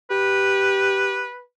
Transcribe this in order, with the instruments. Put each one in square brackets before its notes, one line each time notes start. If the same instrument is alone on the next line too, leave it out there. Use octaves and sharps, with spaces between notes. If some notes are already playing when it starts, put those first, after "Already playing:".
[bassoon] G4 [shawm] B4